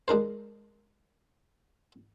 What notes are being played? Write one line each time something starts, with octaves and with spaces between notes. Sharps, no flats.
G#3 D4 A#4 C5